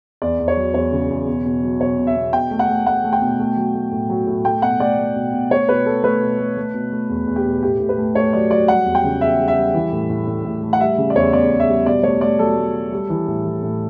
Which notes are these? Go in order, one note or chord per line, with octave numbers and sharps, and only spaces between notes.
E2 D5
E2
C#5
F#3
E2 C#5
C#3
E2
B2
B2
F#3
B2 C#5
B2
E5
B2
B2 G5
A3
F#5
A3
A3 F#5
A3
G5
B2
A3
F#3
A3
A2
F#3
A2
A3 G5
B2 F#5
A3 D5
A3
B2
B2
A3 C#5
B2 B4
A3 A4
A3 B4
B2
A3
A3
B2
A3
E2
E2
G4
B2
A2 G4
A2
B4
A3
A3 C#5
F#3 D5
F#3 D5
G3 F#5
E2
G5
C#3
E2 E5
G3
E5
G3
E3
A2
A2
A2
A2
A3
F#5
G3 E5
C#3
D5
E2 C#5
E2 D5
E2
E5
G3
B2 D5
A3 C#5
A3 D5
F#3 A4
A3
F#3
G3
E3
A2
E3
A2